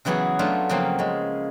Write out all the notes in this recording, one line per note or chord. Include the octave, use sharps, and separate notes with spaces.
C#3 E3 F#3 B3 F#4 G#4
F#3 A3 D4 F4
C#3 F3 F#3 A#3 C4
C#3 G#3